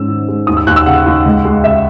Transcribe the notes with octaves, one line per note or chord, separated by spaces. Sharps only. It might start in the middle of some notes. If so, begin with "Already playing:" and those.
Already playing: G#2 C#4 E6
D#3
G#3
D#2 D#6
E6
D#2 F#6
E6
C#3 F#5
D#2
C#2
G#3
C#3 E5